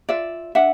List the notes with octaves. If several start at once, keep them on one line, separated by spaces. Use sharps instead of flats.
F4 D5 E5
D4 E5 F#5